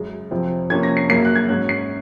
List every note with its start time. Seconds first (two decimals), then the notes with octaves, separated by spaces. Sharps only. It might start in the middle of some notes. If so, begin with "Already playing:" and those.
Already playing: F#2 C#3 G#3
0.31 F2 C3 F3 C4
0.70 F2 C3 F3 A#3 C#4 G#6
0.83 A#6
0.97 C7
1.09 F#2 C#3 F#3 A#3 C7
1.25 F#6
1.35 G#6
1.49 G#2 F#3 C#4 F#6
1.69 C7